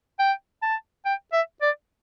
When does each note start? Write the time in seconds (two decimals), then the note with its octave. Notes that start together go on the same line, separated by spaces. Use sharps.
0.19 G5
0.62 A5
1.05 G5
1.33 E5
1.62 D5